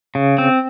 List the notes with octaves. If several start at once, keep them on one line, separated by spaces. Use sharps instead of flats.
C#3
C4